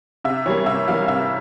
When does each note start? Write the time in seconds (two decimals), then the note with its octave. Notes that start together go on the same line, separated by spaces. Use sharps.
0.24 C3 E5
0.46 E3 G3 A#3 C#5
0.66 C3 E5
0.88 E3 G3 A#3 F5
1.08 C3 E5